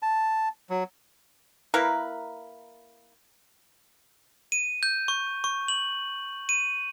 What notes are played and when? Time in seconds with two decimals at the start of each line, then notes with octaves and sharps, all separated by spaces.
0.02 A5
0.70 F#3
1.74 A#3 E4 A#4 B4
4.52 D#7
4.83 G6
5.08 C#6
5.44 C#6
5.68 F#7
6.49 D#7